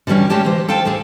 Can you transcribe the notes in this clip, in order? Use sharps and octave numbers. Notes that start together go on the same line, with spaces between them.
D3 E3 G3 C#4 C#5
G#3 A3 C#4 G4 A5
E3 C5
A4 C5 F5 G5 A5
D2 G4 G#4